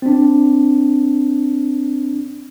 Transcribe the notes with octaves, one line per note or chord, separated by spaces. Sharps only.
C4 D4